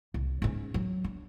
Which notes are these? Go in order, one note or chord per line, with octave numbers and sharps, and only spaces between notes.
C2
G#2 C#4
F#3
D4